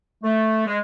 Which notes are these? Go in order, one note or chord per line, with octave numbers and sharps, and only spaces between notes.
A3
G#3